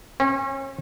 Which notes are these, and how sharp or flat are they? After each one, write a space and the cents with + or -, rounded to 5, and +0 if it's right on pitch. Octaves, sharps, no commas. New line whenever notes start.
C#4 -35